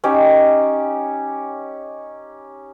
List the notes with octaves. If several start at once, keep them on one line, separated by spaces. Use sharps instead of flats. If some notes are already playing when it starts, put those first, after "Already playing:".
C#4 D#4 G4 C#5